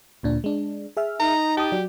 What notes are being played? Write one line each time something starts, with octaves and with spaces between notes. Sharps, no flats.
D2 A#2 D4
G#3 D4
G#4 E5 F6
D#4 A#5
G4 A5 D#6
F#3 F#4 D5